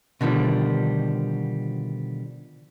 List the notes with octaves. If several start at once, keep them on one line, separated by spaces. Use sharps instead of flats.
B2 D3 D#3 F3 G3